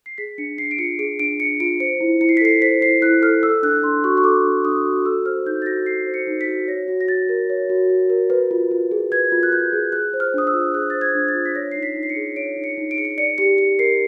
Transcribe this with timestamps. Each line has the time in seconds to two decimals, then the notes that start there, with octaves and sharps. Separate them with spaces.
0.06 C7
0.18 G#4 B6
0.38 D4 C#7
0.58 D4 C7
0.71 D7
0.78 F4 C#7
0.99 G#4 D7
1.19 D4 D7
1.40 D4 C#7
1.60 F4 D7
1.80 C5 C#7
2.01 E4
2.21 E4 C#7
2.29 C7
2.37 B6
2.41 A4 C7
2.62 C5 B6
2.82 E4 C7
3.02 E4 F#6
3.22 A4 F6
3.43 A4 E6
3.63 D4 F#6
3.83 D4 C6
4.04 F#4 C#6
4.17 C#6
4.24 A4 D6
4.45 D4
4.65 D4 D#6
4.85 F#4
5.05 A4 E6
5.26 C5 F6
5.46 D#4 G6
5.62 A6
5.66 F#4 A#6
5.86 A4 C7
6.07 C5
6.14 C#7
6.27 D#4
6.41 B6
6.47 F#4
6.68 C#5 A#6
6.88 F#4
7.01 A#6
7.08 F#4 A6
7.29 A#4
7.50 C#5
7.70 F#4
7.90 F#4
8.10 A#4
8.30 B4
8.51 F4
8.71 F4
8.91 G#4
9.12 B4 G#6
9.32 F4
9.43 F#6
9.52 F4 G6
9.73 G#4
9.92 G#4 F#6
10.14 C5
10.20 F6
10.34 D4 D#6
10.47 E6
10.54 F4
10.74 G#4 F#6
10.90 C5 A6
11.01 G#6
11.15 D4
11.28 A6
11.35 F4
11.45 B6
11.55 C#5 A#6
11.71 D#4 C7
11.83 B6
11.96 D#4
12.03 C7
12.10 C#7
12.16 G#4
12.36 C#5 D7
12.57 D#4
12.64 C#7
12.78 D#4
12.91 D7
12.98 G#4 C#7
13.05 D7
13.18 D5 C#7
13.38 G4 C#7
13.58 G4 C#7
13.79 A#4 C7